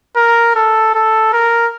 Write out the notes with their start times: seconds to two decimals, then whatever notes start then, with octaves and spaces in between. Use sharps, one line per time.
0.16 A#4
0.55 A4
0.94 A4
1.33 A#4